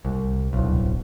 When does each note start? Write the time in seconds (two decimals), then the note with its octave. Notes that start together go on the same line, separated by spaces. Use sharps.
0.05 C2
0.53 D1 B1